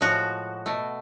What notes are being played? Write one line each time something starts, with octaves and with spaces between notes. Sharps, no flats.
A2 F3 G#3 F#4
B2 A3